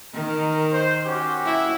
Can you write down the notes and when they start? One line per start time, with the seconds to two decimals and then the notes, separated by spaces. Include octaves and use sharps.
0.14 D#3 A#4
0.72 C5
1.05 C#4 F#4 G4
1.46 E4